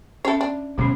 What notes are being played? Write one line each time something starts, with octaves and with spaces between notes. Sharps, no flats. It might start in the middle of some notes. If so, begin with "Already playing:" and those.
C#4 A4 C#5 E5
D4
D1 B2 D#3 G#3 C#4